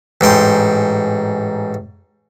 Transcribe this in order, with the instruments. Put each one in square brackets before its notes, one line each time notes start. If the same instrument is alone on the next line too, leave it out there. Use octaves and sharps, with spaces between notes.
[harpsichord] A1 G#2 G5 C6